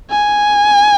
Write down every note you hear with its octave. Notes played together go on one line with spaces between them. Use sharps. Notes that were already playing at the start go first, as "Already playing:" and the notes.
G#5